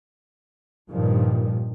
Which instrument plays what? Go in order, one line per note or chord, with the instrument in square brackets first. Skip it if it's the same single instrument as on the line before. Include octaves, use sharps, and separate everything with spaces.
[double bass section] G2 A#2 D#3 F3